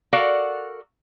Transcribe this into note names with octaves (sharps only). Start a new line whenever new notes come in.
F#4 A4 A#4 D5 F5 F#5